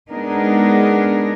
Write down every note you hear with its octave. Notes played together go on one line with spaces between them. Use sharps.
G#3 B3 D4 D#4 G#4 A#4